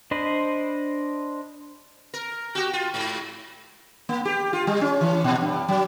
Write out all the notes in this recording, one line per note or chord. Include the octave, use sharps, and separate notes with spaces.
D4 C5 D#5 B5
A#4
F#4 G4
F4
G#2
A#3
G4
F4
G3
C#4
E3
A#2
G2
F#3